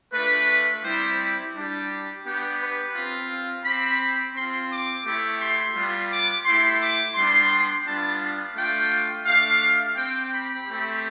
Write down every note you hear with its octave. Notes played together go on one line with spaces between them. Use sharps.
A3 D4 F4 B4
G3 C4 E4 G4 C5
G3 D4 G4
B3 D4 G4
B4
C4 F4
F5
C4 G4 B5
C4 F4 C6
D6
A3 E4 G4
C6
G3 B3 F4
D6
A3 E4 G4 C6
D6
G3 B3 D4 G4 C6
G3 B3 D4 F4 A5
F5
A3 D4 F4 G5
A3 D4 G4 F5
C4 G4 G5
B5
A3 C4 G4